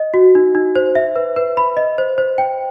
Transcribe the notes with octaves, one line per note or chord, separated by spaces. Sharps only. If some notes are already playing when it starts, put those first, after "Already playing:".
Already playing: D#5
F#4
D#4
D#4
C5
E5
B4
B4
B5
D#5
C5
C5
G5